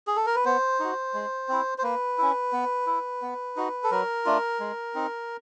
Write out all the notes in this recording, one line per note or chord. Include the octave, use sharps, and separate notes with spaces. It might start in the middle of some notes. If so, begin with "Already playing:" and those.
G#4
A4
A#4
B4
B3 C5
D#4 F#4
G#3
C4 E4
C5
A#3 B4
C#4 E4
B3
E4
B3
D#4 F#4
A4
F#3 A#4
A3 D4 F4
G#3
C4 D#4